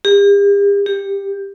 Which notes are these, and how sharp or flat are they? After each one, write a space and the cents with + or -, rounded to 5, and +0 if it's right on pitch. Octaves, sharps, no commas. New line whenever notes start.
G4 +45
G4 +15